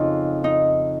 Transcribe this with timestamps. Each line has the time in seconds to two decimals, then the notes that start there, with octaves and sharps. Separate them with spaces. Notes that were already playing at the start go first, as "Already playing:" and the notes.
Already playing: F2 C#3 D#4 F4
0.44 D#4